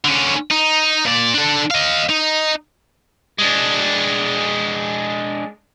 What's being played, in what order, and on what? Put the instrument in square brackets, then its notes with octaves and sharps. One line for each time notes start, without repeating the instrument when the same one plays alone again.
[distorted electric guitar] D3 C#4
D#4
A#2 D5
D4 A4
D#5 F5
D#4
G#3 D4